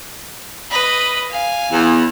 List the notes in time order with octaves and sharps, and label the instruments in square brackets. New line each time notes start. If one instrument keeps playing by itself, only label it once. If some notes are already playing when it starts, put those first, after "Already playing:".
[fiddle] B4 D#5
F5 G#5
[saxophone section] E2